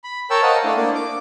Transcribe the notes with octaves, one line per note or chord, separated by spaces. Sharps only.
B5
A#4 C#5 G5 A5 E6
A#4 C5 D#5 F5 F#5 A5
A3 D4 E4 F5
A#3 D4
D6